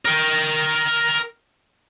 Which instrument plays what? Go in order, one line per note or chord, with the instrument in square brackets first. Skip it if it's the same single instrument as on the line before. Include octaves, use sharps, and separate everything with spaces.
[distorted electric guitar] A#4 G5